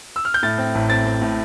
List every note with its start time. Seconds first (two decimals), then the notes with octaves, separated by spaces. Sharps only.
0.16 E6
0.25 F6
0.34 G6
0.43 A2 A6
0.58 C4
0.75 A1
0.90 C4 A6
1.06 C4
1.21 A2